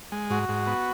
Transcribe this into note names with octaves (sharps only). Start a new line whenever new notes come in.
G#3
G#2 F#4
G#2
B3